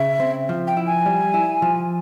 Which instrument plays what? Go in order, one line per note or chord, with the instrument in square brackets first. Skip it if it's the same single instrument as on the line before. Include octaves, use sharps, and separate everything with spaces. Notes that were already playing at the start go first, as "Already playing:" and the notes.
Already playing: [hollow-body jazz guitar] C#3 [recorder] E5
[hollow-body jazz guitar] C4
F3
[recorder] G5
[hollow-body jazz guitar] E4
[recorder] G#5
[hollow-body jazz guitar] G3
E4
F3